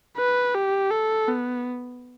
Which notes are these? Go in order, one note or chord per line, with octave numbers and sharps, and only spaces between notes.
B4
G4
A4
B3